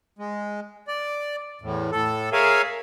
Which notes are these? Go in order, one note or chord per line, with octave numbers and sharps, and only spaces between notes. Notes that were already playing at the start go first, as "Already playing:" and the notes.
G#3
D5
E2 A2
A2 A4
G#4 A#4 C#5 E5 F5 G#5